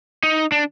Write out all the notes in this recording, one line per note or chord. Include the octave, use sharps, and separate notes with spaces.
D#4
D4